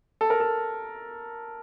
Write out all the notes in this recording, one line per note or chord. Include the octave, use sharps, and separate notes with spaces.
A4
A#4
A4